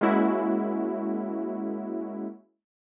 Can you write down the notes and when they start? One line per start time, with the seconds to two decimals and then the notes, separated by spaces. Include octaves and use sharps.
0.01 G#3 A#3 C#4 E4 F#4